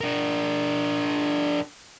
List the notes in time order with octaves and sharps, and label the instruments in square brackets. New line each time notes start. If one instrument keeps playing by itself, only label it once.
[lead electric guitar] D4 A#4